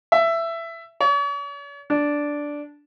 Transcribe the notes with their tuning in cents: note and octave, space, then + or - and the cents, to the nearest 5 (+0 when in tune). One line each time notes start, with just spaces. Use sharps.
E5 +15
C#5 +45
D4 -5